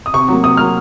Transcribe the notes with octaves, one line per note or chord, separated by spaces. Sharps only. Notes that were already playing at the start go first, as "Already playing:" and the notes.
D#6
C3 C#6
F#3 A#3
C3 D#6
F#3 A#3 F6